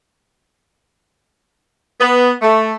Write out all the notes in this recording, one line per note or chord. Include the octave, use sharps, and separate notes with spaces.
B3
A3